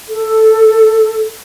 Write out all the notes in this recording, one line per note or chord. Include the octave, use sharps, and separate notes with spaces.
A4